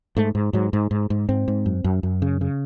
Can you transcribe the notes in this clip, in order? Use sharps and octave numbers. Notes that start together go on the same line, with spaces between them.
G#2 A3
G#2
G#2 F#3
G#2
G#2
G#2
G#2 C4
G#2
F#2
F#2
F#2
C#3
C#3